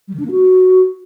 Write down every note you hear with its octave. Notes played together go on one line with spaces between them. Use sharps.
G3
D#3
D4
A#3
F#4